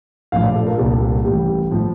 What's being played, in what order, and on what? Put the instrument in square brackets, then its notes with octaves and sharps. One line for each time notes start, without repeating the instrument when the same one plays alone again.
[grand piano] A#1 A2 F3 F5
D5
A4
A#4
C2 A#2 G3 A4
A1 A2 G3 G4
A2 F3